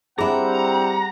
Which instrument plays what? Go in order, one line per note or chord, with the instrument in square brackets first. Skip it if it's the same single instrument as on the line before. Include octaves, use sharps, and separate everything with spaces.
[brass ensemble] G3 C4 F#5 [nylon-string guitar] D4 E4 [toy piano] G#4 [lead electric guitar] A#5